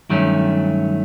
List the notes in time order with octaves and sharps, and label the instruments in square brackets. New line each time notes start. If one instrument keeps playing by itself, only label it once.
[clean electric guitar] G2 D#3 F#3 A3 C#4